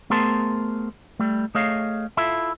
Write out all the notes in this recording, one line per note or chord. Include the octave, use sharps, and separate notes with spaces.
A3 B3 G#4 A#4 C5 A5
G3 A3
A3 G#4 C#5 D#5 F5
E4 F4 A4 E5